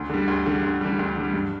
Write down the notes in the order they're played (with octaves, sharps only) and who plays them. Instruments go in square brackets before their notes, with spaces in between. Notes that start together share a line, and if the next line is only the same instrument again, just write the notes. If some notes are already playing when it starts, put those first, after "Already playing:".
Already playing: [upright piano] D2
D3 G3
D2
D3 G3
D2
D3 G3
D2
D3 G3
G2